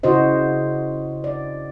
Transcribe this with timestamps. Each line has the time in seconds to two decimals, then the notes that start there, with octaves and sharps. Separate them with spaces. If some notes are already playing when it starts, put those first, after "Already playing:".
0.03 C#3 E4 F#4 C5 D#5
1.24 D5